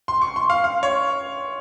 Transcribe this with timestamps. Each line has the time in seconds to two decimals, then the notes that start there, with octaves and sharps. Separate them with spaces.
0.08 C6
0.21 C#6
0.36 C6
0.50 F5
0.64 F5
0.83 C#5